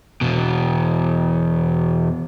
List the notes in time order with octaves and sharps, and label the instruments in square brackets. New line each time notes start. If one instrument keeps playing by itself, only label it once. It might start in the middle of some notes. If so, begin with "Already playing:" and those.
[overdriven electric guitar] E2 B2